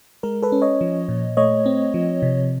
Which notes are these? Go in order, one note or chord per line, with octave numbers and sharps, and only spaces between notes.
G#3 A#4
A4 B4
C#4
C#5 D#5
F3
A#2
A3 C#5 D#5
C4
F3
C3